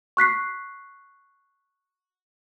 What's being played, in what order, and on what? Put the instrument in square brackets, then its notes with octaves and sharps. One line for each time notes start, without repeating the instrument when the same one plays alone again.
[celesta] C#6 F#6 B6 C7